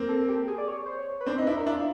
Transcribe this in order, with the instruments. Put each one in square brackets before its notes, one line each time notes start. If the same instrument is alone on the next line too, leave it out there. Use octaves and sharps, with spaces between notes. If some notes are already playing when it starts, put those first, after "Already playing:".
Already playing: [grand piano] A#3 C4
[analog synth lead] A4
G4
G#4
D5
C#5
C5
C#5
B4
[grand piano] C4 D4 [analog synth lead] C5
[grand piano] D#4
[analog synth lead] B4
[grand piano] D4 E4
[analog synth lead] A#4
[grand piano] D4 E4
[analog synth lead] F4